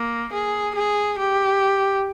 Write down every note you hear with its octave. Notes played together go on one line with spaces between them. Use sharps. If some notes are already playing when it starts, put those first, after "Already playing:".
Already playing: A#3
G#4
G#4
G4